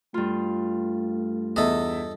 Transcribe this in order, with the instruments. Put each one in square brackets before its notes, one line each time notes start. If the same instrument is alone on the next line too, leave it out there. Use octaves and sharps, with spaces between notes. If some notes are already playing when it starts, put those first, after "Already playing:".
[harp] G2 F4 [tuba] A3
[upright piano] E2 E5 [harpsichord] A4 D#5